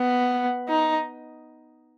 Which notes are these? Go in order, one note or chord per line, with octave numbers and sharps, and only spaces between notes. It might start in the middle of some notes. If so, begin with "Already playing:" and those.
Already playing: B3
D#4